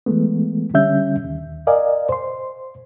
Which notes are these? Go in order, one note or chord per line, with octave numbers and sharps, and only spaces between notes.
E3 G#3 A3 B3
D3 G3 C#4 E5 G6
D#2
A#4 D5 D#5 F5 G#5
C5 C6